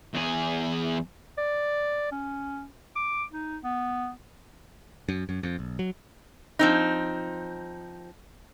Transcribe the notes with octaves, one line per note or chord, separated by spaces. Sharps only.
E2 G#4
D5
C#4
D6
D#4
B3
F#2
F#2
F2
B1
F#3
F3 C4 D#4